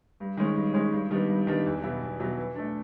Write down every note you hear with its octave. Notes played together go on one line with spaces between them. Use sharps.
G2
D#3 G#3 C#4
G2
D#3 G#3 C#4
G2
D#3 G3 B3 D4
G2
D#3 G3 B3 D4
E2
B2 F#3 B3 E4
E2
B2 F#3 B3 E4
E3
A3 D4